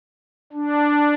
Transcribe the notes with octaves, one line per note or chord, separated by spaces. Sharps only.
D4